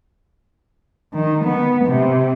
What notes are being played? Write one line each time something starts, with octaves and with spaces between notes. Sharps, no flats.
D#3
B3
C3